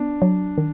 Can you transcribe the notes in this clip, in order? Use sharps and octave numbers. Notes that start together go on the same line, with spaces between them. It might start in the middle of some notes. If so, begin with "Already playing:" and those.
Already playing: B3 D4
F#3
D#3